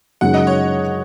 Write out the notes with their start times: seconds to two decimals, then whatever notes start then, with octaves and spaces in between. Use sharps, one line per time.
0.21 F#2 C#3 G#3 D#4 F#5
0.34 D#5
0.47 C#5